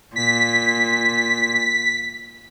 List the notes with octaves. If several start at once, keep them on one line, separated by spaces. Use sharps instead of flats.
A#2 B6